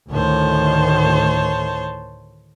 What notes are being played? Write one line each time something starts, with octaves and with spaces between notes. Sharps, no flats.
D2 A2 D#3 C5 C#5 A5